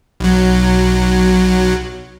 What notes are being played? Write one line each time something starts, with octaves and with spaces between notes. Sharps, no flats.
B1 F#3